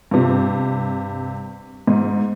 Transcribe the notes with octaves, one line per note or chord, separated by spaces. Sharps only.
G2 C3
G#2